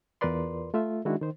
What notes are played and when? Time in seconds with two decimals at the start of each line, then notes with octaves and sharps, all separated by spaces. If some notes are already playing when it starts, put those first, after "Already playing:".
0.21 E2 F4 A#4 B4 D5 C6
0.74 A3 F4 E5
1.05 D#3 G#3 D4 E4 F#4
1.21 D#3 C5